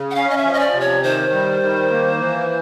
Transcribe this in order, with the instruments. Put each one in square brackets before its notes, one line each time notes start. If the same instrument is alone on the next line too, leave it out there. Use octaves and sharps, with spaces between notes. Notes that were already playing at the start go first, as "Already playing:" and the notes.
Already playing: [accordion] C#3
[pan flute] F#5
[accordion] C#4 [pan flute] F5
[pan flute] D#5
E5
[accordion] F3
[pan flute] D#5
D5
[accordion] C3
[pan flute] C#5
[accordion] D#3 [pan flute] C5
[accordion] G3
D#3
A#3
E3